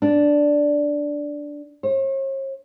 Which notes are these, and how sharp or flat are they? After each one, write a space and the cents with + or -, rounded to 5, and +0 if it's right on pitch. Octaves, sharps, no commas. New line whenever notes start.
D4 -5
C#5 -45